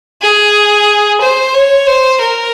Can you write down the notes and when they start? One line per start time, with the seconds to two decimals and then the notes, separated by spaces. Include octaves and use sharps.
0.22 G#4
1.21 C5
1.54 C#5
1.87 C5
2.21 A#4